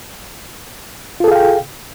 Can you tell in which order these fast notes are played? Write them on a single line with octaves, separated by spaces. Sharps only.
F4 A4 G#4 F5 G5